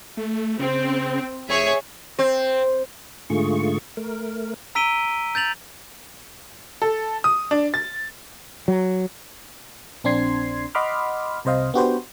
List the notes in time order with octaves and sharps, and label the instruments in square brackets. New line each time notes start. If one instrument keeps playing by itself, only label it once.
[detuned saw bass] A3
[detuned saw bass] C#3 [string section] C4
[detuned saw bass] F1 [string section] G#4 C#5 E5
[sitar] C4
[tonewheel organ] G#2 D3 A3 F4 G#4 C#6
A3 A#4
[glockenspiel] A#5 E6 B6 D7 D#7 G7
G6 A6 F7 F#7
[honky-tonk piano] A4
D#6
D4
A6
[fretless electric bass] F#3
[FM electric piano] A#1 C4 D4 C6 G#6 C7
D#5 F#5 B5 C6 D6 F6
C2 C3 C5 D#5 F5
B3 D4 F#4 G4 B4 C5